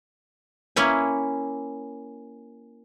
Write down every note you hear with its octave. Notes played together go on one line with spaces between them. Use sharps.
A#3 C#4 E4 G#5